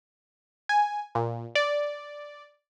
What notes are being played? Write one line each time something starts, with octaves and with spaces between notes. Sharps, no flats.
G#5
A#2
D5